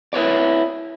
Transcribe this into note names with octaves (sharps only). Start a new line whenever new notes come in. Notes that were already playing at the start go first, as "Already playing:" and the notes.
E4 B4 C#5 D5